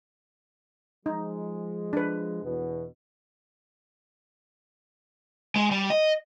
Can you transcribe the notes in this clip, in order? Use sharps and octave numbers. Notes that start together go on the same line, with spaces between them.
F3 G#3 D#4
D4 B4
E2 B2
G#3
G3
D#5